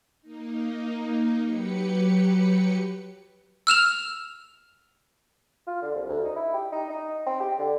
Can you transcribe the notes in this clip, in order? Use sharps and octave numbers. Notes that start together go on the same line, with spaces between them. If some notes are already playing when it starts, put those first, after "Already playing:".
A#3 D#4
F#3 G4 B4 C#7
E6 F6 E7 F7
F4
D3
C2
D2
D#4
E4
G4
D#4
D#4
C4
G4
D3